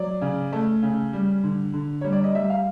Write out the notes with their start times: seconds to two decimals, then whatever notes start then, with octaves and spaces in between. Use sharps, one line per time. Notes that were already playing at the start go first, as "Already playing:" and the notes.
Already playing: F#3 D5
0.21 C#3
0.53 A3
0.83 C#3
1.13 G3
1.44 D3
1.74 D3
2.01 G3 C#5
2.12 D5
2.24 D#5
2.35 G3 E5
2.50 F5